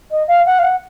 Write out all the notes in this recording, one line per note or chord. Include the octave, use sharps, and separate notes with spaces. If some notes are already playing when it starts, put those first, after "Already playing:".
D#5
F5
F#5
F5
F#5